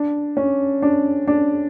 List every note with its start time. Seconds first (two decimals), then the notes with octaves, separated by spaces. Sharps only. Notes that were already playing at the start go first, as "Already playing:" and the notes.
Already playing: D4
0.37 C#4
0.82 D4
1.27 D4